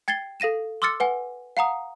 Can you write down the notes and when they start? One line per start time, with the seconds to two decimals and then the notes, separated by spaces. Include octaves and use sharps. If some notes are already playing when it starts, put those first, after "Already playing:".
0.08 G5 G#6 A6 C7 G7
0.40 A4 F5 A#6 D#7 E7
0.82 C6 D6 E6 F6 A6 C#7
1.00 B4 F#5 G#5
1.57 F5 F#5 A#5 D#6